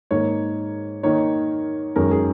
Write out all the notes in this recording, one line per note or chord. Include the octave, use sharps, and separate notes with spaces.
G#2 D#3 A#3 D#4 C#5
D#3 A#3 D#4 C#5
F#2 D#3 G#3 C#4 A#4
G#4